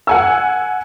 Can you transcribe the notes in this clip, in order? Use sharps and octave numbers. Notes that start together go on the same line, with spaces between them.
F#5 G#5 E6